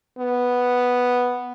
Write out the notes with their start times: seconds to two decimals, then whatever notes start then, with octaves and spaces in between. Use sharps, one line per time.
0.19 B3